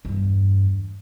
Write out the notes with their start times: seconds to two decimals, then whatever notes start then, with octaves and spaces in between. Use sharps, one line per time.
0.05 E2 G2